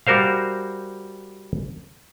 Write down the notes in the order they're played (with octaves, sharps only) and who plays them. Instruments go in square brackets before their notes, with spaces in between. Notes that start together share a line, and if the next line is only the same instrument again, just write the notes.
[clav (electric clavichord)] G3 F#4 A#4 C5 F5